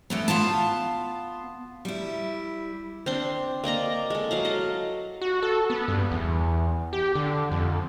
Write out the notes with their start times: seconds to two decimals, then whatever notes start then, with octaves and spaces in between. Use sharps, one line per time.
0.10 E3 A3 B3
0.28 B3 F4 F5 A5
1.85 G3 E4
3.06 C4 D4 C6
3.64 A#3 D5 D#5 A#5
4.10 G#3 A4
4.31 F#3 F5 F#5
4.45 A4 D#5
5.22 F#4
5.43 A4
5.70 B3
5.88 G2
6.12 E2
6.93 G4
7.15 D3
7.51 F2